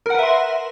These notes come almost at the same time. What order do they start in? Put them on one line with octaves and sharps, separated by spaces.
A#4 F#5 B4 E5 C6